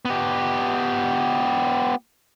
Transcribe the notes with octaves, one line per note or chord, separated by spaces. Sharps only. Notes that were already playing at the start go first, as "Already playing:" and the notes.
B3 G4